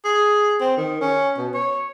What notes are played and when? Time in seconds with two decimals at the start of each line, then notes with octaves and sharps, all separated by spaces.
0.05 G#4
0.60 C4
0.77 D#3
1.01 C#4
1.37 B2
1.54 C#5